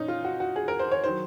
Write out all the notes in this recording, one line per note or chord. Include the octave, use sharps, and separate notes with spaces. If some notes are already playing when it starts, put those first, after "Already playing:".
Already playing: A#2 C#4 D#4
F4
F#4
F#4
G#4
A#4
C5
C#5
D#3 F#3 C5